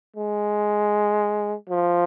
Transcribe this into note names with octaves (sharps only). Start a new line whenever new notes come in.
G#3
F3